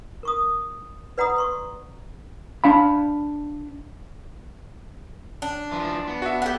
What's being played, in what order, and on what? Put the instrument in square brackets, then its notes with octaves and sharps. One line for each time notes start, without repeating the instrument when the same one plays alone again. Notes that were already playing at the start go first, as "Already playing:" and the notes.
[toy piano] A#4 C#6 D#6
B4 D5 F#5 A#5 B5 D#6
B4 C6 C#6
[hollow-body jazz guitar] D4 F5 B5
[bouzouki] D4
[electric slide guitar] E3 F3
B3
[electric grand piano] F#4 E5
[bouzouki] G4 F#5